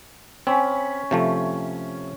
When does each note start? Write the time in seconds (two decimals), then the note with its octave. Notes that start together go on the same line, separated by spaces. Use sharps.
0.47 C4 C#4 B5
1.11 C3 F3 A3